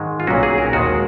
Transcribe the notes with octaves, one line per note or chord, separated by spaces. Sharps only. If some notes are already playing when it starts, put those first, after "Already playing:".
Already playing: G#2 D#3 G#3
F4
B1 A#2 F#3 C#4 F#4
G#4
A#4
D#2 D#3 G#3 F#4